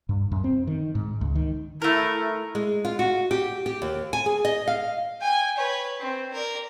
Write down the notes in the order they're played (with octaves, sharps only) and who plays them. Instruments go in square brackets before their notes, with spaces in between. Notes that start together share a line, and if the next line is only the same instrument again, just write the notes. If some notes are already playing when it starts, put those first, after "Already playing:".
[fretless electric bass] G2
F#2
C4
D#3
G#2
C#2
D#3
[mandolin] A3 A#4 [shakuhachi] E4
[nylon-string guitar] G#3
F4
F#4
G4
G4
D#2
G#5
G#4
D#5
F5
[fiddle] G5 G#5
B4 C#5
C4
A#4 D5